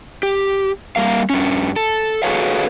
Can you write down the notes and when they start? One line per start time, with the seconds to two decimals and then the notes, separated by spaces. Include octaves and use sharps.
0.23 G4
0.96 G3 A#3 F5
1.30 G2 C#4
1.76 A4
2.23 F#4 G#4 A4 B4 C#5 F5